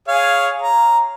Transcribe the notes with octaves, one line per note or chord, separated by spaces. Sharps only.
G#4 C#5 F5
A#5